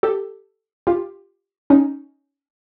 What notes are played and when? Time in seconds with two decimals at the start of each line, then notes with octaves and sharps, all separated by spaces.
0.03 G4 A4
0.87 F4 G4
1.70 C#4 D#4